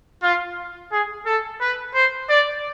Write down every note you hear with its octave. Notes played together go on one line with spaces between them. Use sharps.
F4
G#4
A4
B4
C5
D5